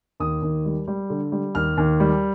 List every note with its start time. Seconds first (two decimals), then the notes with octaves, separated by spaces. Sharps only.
0.20 D#2 D#6
0.42 D#2
0.65 G3
0.88 G3
1.10 D3
1.32 G3
1.55 D#2 F6
1.77 D#2
2.00 G3